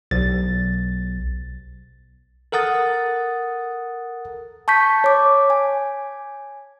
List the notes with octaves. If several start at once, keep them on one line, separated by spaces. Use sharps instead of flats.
B1 A6
A4 A#4 F#5 D#6 A6
A5 C#6 G6 B6
C#5 D6
G#5